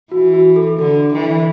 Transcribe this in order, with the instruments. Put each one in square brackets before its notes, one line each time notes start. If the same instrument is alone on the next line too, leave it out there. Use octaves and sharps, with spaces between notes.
[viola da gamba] E3 [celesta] F#4
[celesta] F#4
A4
[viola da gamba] D3 [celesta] A4
[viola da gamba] E3